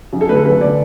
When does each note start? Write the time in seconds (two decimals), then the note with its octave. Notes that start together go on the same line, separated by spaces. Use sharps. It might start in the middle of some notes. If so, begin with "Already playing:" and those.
0.13 F#2
0.21 A4
0.29 D3 A3 B4
0.37 A4
0.45 F#2 B4
0.61 D3 A3 D5